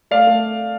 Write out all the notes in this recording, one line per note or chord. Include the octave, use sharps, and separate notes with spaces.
A3 D5 F5
A3